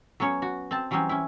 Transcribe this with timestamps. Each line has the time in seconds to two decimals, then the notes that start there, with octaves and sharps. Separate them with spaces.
0.20 F#3 B3 C#4 C#5
0.42 F#4
0.71 C4 A5
0.91 E3 F#3 G3 C4 C#4
1.09 C#4 E4